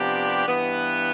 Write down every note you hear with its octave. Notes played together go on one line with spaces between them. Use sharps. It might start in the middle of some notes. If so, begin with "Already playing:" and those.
Already playing: C3 F3 B3 D4 G4
G2 E3 B3